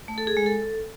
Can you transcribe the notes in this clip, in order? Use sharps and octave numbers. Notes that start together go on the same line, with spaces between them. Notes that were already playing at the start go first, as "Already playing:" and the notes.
A3
A4
G#4
G#3
A4